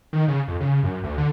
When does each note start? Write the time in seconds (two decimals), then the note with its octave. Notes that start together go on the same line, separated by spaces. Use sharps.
0.13 D#3
0.28 C#3
0.48 F2
0.60 C#3
0.83 F#2
1.04 D2
1.18 D3